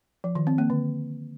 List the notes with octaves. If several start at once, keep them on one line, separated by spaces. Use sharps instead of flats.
F3
D#3
C4
A#3
D3